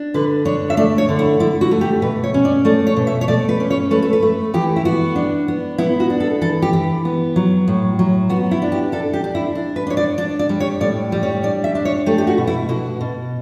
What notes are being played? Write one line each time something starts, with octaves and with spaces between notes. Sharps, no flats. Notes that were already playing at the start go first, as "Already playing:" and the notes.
Already playing: D4
D3 B4
D4 C#5
E5
A3 D5
C#5
D3
E4
D3 E4
F#4
A3
G4
B2 B4
C#5
C#4
D5
A3 D5
C#5
B2
E5
C#5
A3 D5
B4
C#4
C#5
A3 B4
A4
B4
A3
E3 G4
E4
B3 F#4
D4
B3
B3 E4
F#4
D4
A4
E3 A4
G4
E3
B3
F#3
A2
F#3
B3 F#4
E4
D4
G4
D4 A4
G4
D4
E4
D4
B4
D4 C#5
D5
D4 D5
D5
G3
C#5
A2 D5
G3
C#5
D4 D5
E5
D4
C#5
A3 G4
G4
F#4
B2
E4
B2 F#4
B2